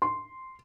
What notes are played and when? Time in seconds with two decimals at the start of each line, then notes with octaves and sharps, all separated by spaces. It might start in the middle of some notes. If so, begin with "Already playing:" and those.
0.02 C6